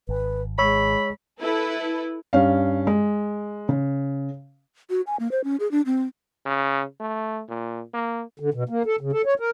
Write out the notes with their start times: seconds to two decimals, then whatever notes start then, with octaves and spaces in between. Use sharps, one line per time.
0.09 G#1 B4
0.59 G#3 C#5 B5 C#6 E6
1.40 E4 A4 B4
2.33 G2 C#4 F5
2.87 G#3
3.69 C#3
4.90 F#4
5.07 G#5
5.20 A#3
5.31 C5
5.44 C#4
5.60 G#4
5.71 D4
5.86 C4
6.46 C#3
7.00 A3
7.49 A#2
7.94 A#3
8.40 D3
8.54 B2
8.69 A#3
8.86 A4
9.01 C#3
9.13 A4
9.25 C#5
9.40 A#4